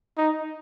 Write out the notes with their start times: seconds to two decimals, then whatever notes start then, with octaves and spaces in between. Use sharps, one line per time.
0.17 D#4